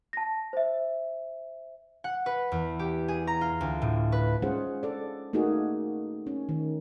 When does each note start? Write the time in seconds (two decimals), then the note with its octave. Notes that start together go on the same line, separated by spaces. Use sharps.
0.13 A5 A#6
0.53 C5 E5
2.04 F#5
2.26 B4
2.52 E2
2.79 G4
3.08 G#4
3.27 A#5
3.41 F4
3.61 D2
3.82 A2
4.12 B4
4.42 G#3 C#4 F4 G#4 C5 F#5
4.83 A4 D5
5.33 A3 A#3 D#4 F#4 G#4
6.27 C#4
6.49 D#3